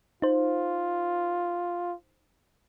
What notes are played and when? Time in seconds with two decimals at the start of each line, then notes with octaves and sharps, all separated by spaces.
0.22 D#4 F4 C5